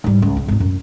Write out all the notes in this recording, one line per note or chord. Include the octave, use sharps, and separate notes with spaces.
G#2 G3
C#2
C#3
G#1 E4
F#2